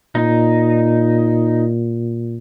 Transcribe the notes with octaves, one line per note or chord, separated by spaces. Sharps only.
A#2 D#4